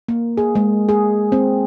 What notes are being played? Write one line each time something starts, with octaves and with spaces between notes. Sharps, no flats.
A#3
G#4
G#3
G#4
C4